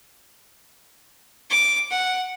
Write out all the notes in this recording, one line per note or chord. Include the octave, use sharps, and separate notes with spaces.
D6
F#5